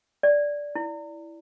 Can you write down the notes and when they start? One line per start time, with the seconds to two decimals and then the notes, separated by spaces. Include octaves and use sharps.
0.23 D5
0.75 E4